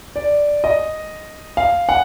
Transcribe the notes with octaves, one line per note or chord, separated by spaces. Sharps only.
D5
D#5
F5
F#5